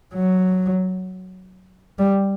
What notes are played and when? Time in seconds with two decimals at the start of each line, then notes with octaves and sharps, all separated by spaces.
0.14 F#3
1.98 G3